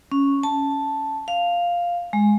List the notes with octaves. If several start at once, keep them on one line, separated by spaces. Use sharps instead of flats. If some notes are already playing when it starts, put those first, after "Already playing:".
C#4
A5
F5
G#3